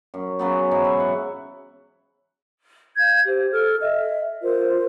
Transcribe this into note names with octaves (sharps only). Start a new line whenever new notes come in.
F#2
C#3 F#3 B3
G#2 E3 F#3
E5
F#5
F5 G6 G#6
G4 C5
A4 F6
D#5 E5
F4 A#4 C5